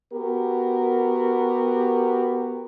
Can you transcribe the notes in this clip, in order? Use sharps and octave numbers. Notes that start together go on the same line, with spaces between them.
B3 F#4 G4 A#4